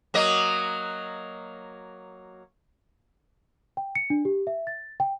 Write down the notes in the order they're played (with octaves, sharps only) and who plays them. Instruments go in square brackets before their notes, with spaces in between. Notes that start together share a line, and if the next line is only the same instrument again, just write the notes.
[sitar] F#3 A#3 D#5
[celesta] G5
C#7
D4
G4
E5
A6
G5